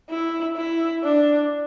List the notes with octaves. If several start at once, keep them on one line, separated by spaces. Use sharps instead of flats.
E4
E4
D4